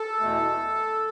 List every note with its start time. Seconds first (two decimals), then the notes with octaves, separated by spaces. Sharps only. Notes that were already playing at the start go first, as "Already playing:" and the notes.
Already playing: A4
0.20 E2 B2 A3